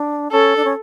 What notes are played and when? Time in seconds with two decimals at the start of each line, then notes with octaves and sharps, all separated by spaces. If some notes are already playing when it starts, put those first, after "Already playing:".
Already playing: D4
0.32 C#4 A4
0.56 D4
0.65 C#4